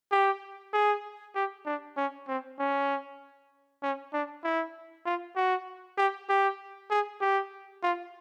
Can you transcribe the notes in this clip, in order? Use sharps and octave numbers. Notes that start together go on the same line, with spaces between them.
G4
G#4
G4
D4
C#4
C4
C#4
C#4
D4
E4
F4
F#4
G4
G4
G#4
G4
F4